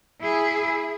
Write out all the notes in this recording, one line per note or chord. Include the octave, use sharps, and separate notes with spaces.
E4 G#4